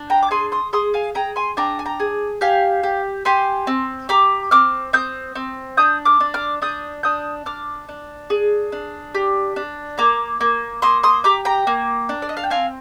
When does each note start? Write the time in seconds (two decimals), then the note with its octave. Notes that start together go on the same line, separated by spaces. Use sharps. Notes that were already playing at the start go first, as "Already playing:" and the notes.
Already playing: D4
0.10 G5 A#5
0.23 D6
0.31 G#4 G#5 C6
0.52 C6 D#6
0.73 G#4 C6 D#6
0.94 F5 G#5
1.15 G#4 G5 A#5
1.36 G#5 C6
1.57 D4 G5 A#5
1.79 G#5
1.85 G5 A#5
2.00 G#4
2.41 G4 F5 G#5
2.83 G4
3.25 G4 G#5 C6
3.67 C4
4.09 G4 A#5 D6
4.51 C4 D6 F6
4.93 C4 D#6 G6
5.35 C4
5.77 D4 D#6 G6
6.05 D6 F6
6.20 D4
6.34 D6 F6
6.62 D4 D#6 G6
7.03 D4 D#6 G6
7.46 D4 D6 F6
7.89 D4
8.30 G#4
8.72 D4
9.14 G4
9.56 D4
9.98 A#3 A#5 D6
10.41 A#3
10.82 A#3 C6 D#6
11.03 C6 D#6
11.24 G4 A#5 D6
11.45 G5 A#5
11.67 A#3
12.09 D4
12.22 D5
12.29 D#5
12.37 F5
12.44 G5
12.50 C4 F5 G#5